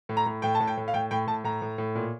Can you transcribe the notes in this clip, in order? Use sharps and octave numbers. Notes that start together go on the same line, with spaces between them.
A2
A#5
A2
A2 G5
A5
A2
G5
A2
F5
A2 G5
A2 G5
A2 A5
A2 A#5
A2
A2
A#2